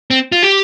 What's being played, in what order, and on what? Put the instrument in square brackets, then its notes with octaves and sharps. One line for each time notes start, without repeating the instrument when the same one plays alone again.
[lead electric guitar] C4
F4
G4